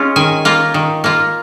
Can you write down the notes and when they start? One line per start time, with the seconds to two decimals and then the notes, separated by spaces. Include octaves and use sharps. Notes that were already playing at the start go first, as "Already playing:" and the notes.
Already playing: G#3 C#4 F4
0.16 D#3 G#5
0.45 A#3 F4
0.74 D#3
1.04 A#3 F4